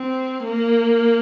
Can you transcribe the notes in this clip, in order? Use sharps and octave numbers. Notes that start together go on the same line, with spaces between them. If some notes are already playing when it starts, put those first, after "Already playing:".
Already playing: C4
A#3